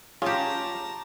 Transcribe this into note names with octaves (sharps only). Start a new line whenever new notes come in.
C#4 F4 G4 G#4 C#5 A5 A#5